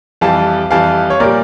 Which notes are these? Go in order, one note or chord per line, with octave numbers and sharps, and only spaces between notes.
F2 E3 G3 F5 A5
F2 E3 G3 F5 A5
C#5
A#2 G3 A#4 D5